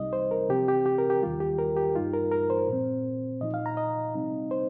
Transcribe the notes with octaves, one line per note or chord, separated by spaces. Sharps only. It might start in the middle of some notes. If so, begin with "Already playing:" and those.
Already playing: C2 C3 G3 D#4 D#5
C5
A#4
C3 F3 C4 G4
G4
G4
A#4
G4
D#2 D#3 G3 F4
G4
A#4
G4
G2 G3 D#4 F4
A#4
A#4
C5
A#2 F3 C4
A#2 F3 D#4 D#5
F5
A#5
D#5
C3 G3 C4 D#4
C5